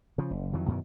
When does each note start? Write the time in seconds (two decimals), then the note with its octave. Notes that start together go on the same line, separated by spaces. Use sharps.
0.18 C#3 F3
0.31 F#1
0.53 F2 D#3 E3 F#3
0.68 F#2 B2 D#3 E3